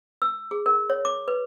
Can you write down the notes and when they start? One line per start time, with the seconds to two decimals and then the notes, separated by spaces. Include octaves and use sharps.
0.22 E6
0.51 G#4
0.66 A#4
0.90 C#5
1.05 D6
1.28 B4